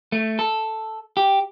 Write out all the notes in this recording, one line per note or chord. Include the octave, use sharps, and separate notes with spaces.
A3
A4
G4